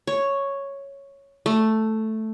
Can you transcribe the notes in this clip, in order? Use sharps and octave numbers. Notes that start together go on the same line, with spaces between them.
C#5
A3